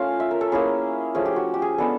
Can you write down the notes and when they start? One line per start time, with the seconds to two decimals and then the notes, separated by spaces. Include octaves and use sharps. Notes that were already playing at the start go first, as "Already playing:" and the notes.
Already playing: A3 C#4 F4 F5
0.20 E5
0.31 A#4
0.41 A4
0.52 A#3 C#4 E4 G#4
1.15 F3 A3 C#4 G#4
1.26 G4
1.36 F#4
1.54 G4
1.62 G#4
1.78 G#3 B3 D4 A4